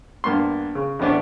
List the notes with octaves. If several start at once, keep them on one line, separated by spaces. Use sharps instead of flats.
G2 A#3 B3 C6
C#3
E2 A2 D3 B3 C#4 D4